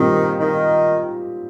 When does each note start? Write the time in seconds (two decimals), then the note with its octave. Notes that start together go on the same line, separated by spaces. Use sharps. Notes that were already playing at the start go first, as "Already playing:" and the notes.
Already playing: A#2 D#3 G3 C4 D#4 G4
0.40 D#3